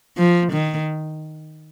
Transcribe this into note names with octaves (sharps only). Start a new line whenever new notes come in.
F3
D#3